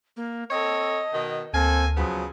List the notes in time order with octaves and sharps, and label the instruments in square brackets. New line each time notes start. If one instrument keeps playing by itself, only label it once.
[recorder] A#3
[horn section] C4 A4 C#5 [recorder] D#5
[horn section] B2 D#3
[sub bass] D2 [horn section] A#3 A4 G#5 [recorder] C4
[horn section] C#3 F3 B3 [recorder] F#3